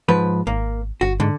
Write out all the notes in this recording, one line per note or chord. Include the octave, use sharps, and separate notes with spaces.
G#2 F3 B4
G#1 A#3
G1 F#4
G#2 D3